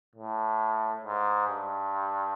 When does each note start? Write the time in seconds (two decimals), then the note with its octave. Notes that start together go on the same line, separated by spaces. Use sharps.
0.16 A2
1.04 G#2
1.48 G2